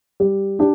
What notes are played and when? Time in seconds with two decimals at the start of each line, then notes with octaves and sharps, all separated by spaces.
0.20 G3
0.59 D4 G4